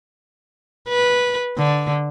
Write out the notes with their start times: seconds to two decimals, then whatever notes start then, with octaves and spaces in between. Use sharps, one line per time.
0.89 B4
1.58 D3